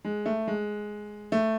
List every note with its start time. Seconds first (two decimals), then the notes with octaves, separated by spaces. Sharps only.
0.05 G#3
0.26 A3
0.47 G#3
1.32 A3